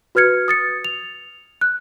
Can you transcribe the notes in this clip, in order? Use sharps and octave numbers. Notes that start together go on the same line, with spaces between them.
F#4 B4 F6 G#6 C#7
D#6 A6 C#7
F7
F#6